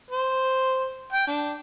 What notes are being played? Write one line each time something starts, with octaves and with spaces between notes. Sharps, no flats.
C5
G5
D4